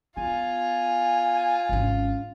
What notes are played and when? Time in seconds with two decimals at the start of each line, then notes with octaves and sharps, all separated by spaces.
0.17 B3 F4 G#5
1.69 G#1 C#4